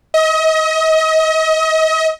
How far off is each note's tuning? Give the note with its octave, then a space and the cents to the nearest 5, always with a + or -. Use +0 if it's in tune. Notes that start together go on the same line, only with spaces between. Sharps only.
D#5 +35